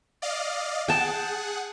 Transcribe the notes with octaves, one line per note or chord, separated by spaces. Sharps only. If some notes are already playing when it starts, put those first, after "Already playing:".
D5 D#5 F5
G#4 F#5 G5 A5